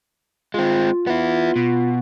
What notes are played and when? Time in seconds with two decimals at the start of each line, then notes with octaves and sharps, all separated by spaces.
0.54 G#3 C4 F4
1.07 B3 E4
1.56 B2